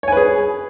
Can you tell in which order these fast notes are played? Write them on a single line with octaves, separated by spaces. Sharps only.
C#5 G#5 B4 G#4